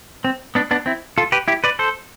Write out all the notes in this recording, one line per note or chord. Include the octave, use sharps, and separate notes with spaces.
C4
B3 D4
B3 D4
C4 E4
F4 A4
G4 B4
E4 G4
B4 D5
A4 C5